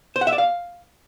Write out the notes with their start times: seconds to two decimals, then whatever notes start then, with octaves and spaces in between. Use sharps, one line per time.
0.16 C5
0.21 F#5
0.27 E5
0.33 D5
0.38 F5